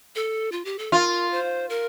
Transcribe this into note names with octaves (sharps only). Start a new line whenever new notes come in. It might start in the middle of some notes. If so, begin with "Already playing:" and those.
A4
F4
G4
A4
F4 A#4
C5
A#4